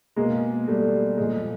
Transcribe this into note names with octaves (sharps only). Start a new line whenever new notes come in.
B2 G#3 A#3
G3 A3
A#2 F3 G#3